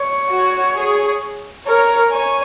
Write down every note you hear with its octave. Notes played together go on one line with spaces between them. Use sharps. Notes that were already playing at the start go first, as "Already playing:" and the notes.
Already playing: C#5
F#4
G#4
A#4 C#5
C#5 G#5